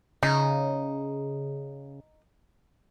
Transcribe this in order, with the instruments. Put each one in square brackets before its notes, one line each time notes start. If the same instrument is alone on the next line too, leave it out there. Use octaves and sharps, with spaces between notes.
[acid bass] C#3 [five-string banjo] D#4